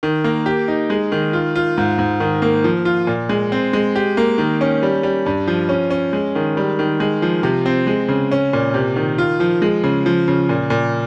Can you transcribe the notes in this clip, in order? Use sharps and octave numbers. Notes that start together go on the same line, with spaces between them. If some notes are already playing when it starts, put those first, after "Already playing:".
D#3
A#3
G4
D#4
G#3
D#3
F4
F4
G#2
G#2
D#3
A#3
F3
F4
A#2
G#3
C4
G#3
G4
A#3
D#3
C#4
G3
G3
G2
F3
C#4
C#4
G#3
D#3
G3
D#3
G#3
F3
C3
C4
G#3
C#3
C#4
A#2
C3
D#3
F4
F3
G#3
C#3
F3
C#3
A#2
A#2